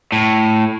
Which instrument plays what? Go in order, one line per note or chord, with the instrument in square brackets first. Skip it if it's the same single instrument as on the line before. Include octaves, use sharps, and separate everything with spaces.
[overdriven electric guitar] A2